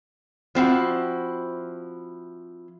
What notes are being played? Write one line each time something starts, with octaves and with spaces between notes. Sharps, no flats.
F3 C4 E4 F#4